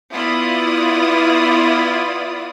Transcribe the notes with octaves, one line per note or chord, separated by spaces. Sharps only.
B3 E4 F4 D5 D#6